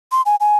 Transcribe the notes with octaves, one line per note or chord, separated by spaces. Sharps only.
C6
G#5
G#5